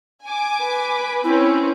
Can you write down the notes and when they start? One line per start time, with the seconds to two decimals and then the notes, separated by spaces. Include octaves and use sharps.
0.24 G#5 D6
0.63 B4
1.24 C4 C#4 E4